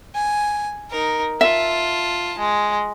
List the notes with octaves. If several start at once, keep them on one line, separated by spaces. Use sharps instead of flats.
G#5
D#4 A#4
F4 E5 A5
G#3